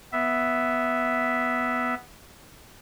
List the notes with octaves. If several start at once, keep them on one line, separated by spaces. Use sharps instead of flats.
B3 E5